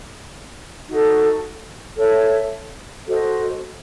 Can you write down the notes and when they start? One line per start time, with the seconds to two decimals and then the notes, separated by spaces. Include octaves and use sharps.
0.89 D#4 F#4 A4
1.97 A4 C#5 E5
3.06 F#4 A4 C5 D#5